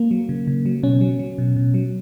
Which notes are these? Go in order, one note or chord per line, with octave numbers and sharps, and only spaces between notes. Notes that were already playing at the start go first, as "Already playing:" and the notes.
Already playing: A#3
F#3
C#3
C#3
F#3
B2 C#4
F#3
F#3
B2
B2
F#3